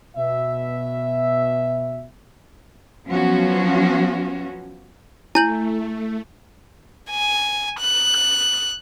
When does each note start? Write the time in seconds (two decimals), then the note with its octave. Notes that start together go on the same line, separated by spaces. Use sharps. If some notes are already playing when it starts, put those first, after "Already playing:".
0.17 B2 E5
3.07 F3 F#3 B3 C#4 F#4
5.35 A3 E4 G#5 G6 F#7
7.10 G#5
7.79 F#6